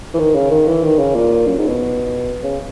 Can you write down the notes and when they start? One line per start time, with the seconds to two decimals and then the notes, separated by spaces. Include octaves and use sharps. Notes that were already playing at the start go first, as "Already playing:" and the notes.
0.14 E3
0.19 D#3
0.35 C#3
0.51 D#3
0.67 E3
0.84 D#3
0.99 C#3
1.15 A#2
1.47 F#2
1.58 G#2
1.68 B2
2.43 C#3